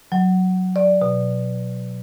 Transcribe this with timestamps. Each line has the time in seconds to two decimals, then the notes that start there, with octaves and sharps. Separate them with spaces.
0.12 F#3
0.76 D5
1.02 B2